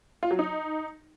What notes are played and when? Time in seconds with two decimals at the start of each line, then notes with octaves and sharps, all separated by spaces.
0.23 F4
0.31 F#3
0.39 D#4